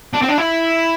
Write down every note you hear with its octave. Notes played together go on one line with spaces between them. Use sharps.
D4
C4
D4
E4